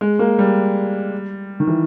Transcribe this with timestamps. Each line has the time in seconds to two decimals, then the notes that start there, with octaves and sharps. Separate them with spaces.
0.01 G#3
0.19 A#3
0.39 G3
1.60 D#3
1.67 E3